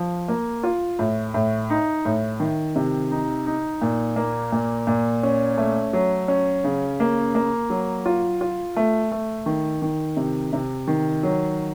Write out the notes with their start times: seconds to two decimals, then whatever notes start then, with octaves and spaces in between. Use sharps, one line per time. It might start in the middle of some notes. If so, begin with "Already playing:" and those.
Already playing: F3
0.28 A#3
0.63 F4
0.99 A2
1.34 A2
1.70 D#4
2.05 A2
2.40 D#3
2.76 C3
3.11 D#4
3.46 D#4
3.81 A#2
4.16 A#3
4.52 A#2
4.87 A#2
5.23 C#4
5.58 A3
5.93 F#3
6.28 C#4
6.64 C#3
7.00 A#3
7.35 A#3
7.70 F#3
8.06 F4
8.41 F4
8.76 A3
9.12 A3
9.46 D#3
9.82 D#3
10.17 C3
10.53 C3
10.87 D#3
11.23 F#3